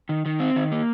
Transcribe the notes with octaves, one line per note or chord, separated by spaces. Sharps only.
D#3
D#3
C4
D#3
A#3